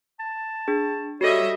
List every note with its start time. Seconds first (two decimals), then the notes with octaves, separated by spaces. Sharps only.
0.20 A5
0.68 D4 G#4
1.21 G3 F#4 A4 C#5 D#5 E5